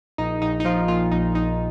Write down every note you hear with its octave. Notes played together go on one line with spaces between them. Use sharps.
A#1 D#4
A#1 D#4
D#4
F3 F4
A#2 F4
A#1 D#4
A#1 D#4